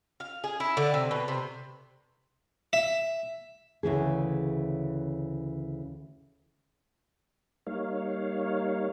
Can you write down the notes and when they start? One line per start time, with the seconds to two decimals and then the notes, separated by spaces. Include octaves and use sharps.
0.20 F5
0.44 G#4
0.60 E4
0.77 D3
0.94 C3
1.11 B2
1.28 C3
2.73 E5
3.83 D2 C#3 E3 G#4
7.67 G3 A#3 D#4 C#5 F5